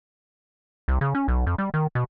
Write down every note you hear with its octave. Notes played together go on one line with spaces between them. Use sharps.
C2
C#3
C#4
B1
F2
G3
D#3
B2